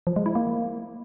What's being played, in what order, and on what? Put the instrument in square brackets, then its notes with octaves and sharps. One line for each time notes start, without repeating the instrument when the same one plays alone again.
[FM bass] F3
G#3
E4
A#3